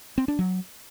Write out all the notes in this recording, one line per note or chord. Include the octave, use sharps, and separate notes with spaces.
C4
D4
F#3